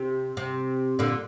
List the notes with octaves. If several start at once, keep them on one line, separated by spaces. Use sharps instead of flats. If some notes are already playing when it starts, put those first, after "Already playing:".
Already playing: C3
C3
A#2 D3